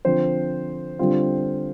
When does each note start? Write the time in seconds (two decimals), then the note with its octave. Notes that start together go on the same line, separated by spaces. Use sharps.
0.05 D3 F3 C4 C5
0.99 D3 G3 C4 F4